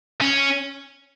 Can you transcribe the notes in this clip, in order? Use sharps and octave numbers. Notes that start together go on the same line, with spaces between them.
C#4